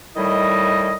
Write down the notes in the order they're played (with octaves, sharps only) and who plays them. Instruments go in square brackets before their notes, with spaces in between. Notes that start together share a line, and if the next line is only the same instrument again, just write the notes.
[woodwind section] A2 D#3 G3 E4 D#5